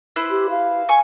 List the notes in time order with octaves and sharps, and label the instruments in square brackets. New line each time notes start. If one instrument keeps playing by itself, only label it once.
[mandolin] E4 B4 C5
[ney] G4
F5
[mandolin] G#5 C#6